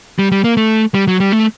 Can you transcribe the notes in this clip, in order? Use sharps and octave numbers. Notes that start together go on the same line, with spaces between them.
G3
G3
A#3
A3
G3
F#3
G3
A3